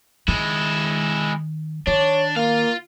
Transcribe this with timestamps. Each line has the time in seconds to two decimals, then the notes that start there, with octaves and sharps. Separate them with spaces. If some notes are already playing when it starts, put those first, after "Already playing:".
0.28 D#3 G#3 E4
1.87 D#3 D4 C#5
2.36 A#3 F4 F5